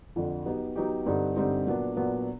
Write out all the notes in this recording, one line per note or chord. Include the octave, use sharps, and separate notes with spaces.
F2 D3 F3
F#3 B3 D#4 G4
F#3 B3 D#4 G4
G2 D3 G3 C4 D#4
G2 D3 G3 C4 D#4
A#2 F#3 B3 D4
A#2 F#3 B3 D4